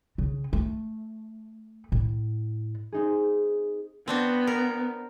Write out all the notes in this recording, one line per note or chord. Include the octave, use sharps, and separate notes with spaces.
C#3
A3
A2
C4 D#4 G#4
B3 C4 D4 F#4
A#4